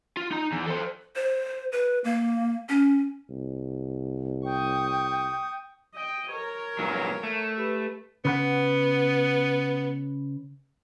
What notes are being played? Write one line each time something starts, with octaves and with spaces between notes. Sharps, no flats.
F4
D#4 A#5
E2
A4 C5
C5
B4
A#3
C#4
C2
G5 C#6 D#6
D#5 G5
A#4 C#5
G2 A#2 F#3
A3
G4 B4
C#3 B3 B4 F#5